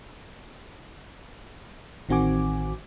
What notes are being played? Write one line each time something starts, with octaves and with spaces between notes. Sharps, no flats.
A1 D#3 C4 F#4 G#5 D6